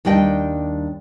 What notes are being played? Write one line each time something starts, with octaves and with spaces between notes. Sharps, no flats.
D#2 G3 D4 D#5 G5